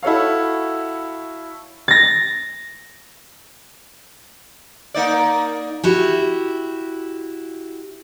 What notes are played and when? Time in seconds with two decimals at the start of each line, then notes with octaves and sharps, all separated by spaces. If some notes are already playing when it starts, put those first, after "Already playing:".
0.03 E4 F#4 A4 C#5 F5
1.88 A6 A#6
4.94 A#3 D#4 D5
5.83 E4 F#4 G4